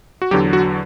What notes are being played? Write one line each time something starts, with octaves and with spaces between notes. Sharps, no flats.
F#4
E2 D3 F#3 G4
F#4